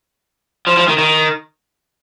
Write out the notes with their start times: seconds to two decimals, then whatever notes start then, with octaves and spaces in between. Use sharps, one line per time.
0.67 F3
0.77 F3
0.88 D#3
0.98 D#3